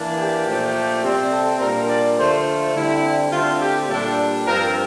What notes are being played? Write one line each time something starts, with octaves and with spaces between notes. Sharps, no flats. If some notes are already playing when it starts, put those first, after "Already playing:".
Already playing: E3 A#3 D4
G4
A#2 F3 A3 D4
C3 G3 C4
A4
A#2 G3 A#3 D4 A#4
D5
D3 F3 A3 C5
F4
D3 G3 C4 E4
D3 A3 C4 F4
G4
A#2 G3 D4 A4
G2 F3 C4 A#4